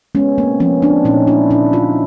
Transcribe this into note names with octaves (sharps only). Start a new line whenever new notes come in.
G#3 B3 C#4
A#3 C4
F3 B3 C#4
C4 D4
A#2 C#4 D#4
D4 E4
A#2 D4 E4
D#4 F4